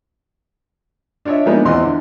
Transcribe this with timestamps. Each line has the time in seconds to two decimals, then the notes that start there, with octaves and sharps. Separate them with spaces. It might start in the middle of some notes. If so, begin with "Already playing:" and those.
1.25 D4 F4 C#5 D#5 E5
1.46 F3 G#3 A#3 B3 D4 D#4
1.65 E2 E3 C4 D#5 C6
1.82 D3